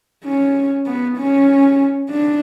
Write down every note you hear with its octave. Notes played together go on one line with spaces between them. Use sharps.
C#4
B3
C#4
D4